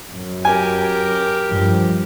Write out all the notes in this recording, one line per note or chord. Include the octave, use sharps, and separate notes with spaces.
F#2
G4 A#4 G#5
G2 F3